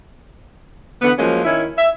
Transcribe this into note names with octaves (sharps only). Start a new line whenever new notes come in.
D3 E3 B3
F3 F#3 G#3 A#3 C#4
D#3 C#4 E4
E5